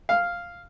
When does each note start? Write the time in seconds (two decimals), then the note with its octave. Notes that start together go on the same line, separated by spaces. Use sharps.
0.09 F5